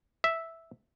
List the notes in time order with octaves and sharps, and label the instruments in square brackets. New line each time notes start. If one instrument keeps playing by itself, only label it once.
[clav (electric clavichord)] E5